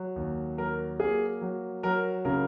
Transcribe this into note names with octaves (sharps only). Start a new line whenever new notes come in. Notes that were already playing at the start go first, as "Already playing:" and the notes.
Already playing: F#3
D#2
F#3 A#4
A#3 G#4
F#3
F#3 A#4
C#3 A#4